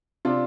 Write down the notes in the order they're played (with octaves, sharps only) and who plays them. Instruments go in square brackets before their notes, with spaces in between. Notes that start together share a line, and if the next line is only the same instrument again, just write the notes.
[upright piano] C3 D4 F4